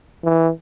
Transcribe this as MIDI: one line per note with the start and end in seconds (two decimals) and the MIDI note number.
0.24 0.50 52